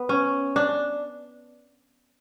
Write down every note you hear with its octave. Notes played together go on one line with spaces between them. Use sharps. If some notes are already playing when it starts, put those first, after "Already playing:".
Already playing: B3
C#4
D4